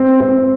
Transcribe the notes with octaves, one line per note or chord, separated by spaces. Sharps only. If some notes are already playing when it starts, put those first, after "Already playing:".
Already playing: C4
C4